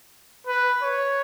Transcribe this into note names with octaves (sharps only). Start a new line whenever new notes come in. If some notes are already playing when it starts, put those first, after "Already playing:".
B4
C#5